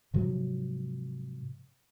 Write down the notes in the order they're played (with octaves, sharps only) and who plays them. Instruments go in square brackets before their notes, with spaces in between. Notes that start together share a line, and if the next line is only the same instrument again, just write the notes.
[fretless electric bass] G#2 C3 F3 F#3